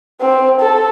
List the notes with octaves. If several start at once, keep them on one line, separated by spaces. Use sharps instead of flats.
C4
A4